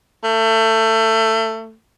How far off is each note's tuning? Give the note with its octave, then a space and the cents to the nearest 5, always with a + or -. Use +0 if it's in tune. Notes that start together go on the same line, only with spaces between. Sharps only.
A3 +25